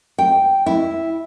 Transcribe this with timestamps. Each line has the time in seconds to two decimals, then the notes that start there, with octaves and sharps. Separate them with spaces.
0.18 G5
0.66 E4